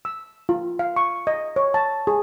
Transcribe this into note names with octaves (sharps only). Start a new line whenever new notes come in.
E6
F4
F5
C#6
D#5
C#5
A5
G#4